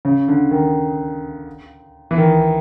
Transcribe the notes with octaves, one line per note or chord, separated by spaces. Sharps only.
C#3
D3
D#3
E3
D#3